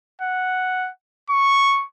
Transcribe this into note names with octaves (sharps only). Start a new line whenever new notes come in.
F#5
C#6